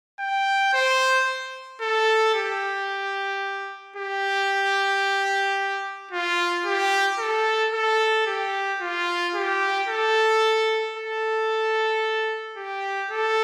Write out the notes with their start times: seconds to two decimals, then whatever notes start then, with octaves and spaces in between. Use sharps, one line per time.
0.20 G5
0.73 C5
1.81 A4
2.34 G4
3.96 G4
6.11 F4
6.65 G4
7.19 A4
7.73 A4
8.26 G4
8.80 F4
9.34 G4
9.88 A4
10.96 A4
12.57 G4
13.11 A4